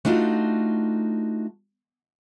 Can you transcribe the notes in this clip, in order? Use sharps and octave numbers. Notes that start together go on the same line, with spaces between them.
A3 D4 D#4 F4 F#4